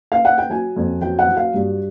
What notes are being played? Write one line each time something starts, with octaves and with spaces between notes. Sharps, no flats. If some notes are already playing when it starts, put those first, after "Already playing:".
F5
F#5
G5
F#3 G#5
F2
F#3 G5
F#5
F#3
F5
G2